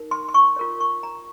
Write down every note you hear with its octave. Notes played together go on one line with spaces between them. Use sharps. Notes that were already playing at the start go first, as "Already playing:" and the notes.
Already playing: D#4 A#4
C6
C6
C#6
F4 A#4 C#5
C#6
A#5